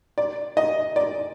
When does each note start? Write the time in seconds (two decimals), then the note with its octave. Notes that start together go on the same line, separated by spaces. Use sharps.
0.18 D5
0.57 D#5
0.96 D5